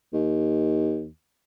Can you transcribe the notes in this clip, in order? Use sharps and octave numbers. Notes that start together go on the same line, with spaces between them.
D#2